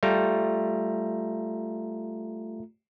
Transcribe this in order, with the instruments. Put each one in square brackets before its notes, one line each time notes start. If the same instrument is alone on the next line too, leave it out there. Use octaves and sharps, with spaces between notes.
[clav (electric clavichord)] G3 [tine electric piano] A3 F4 A#5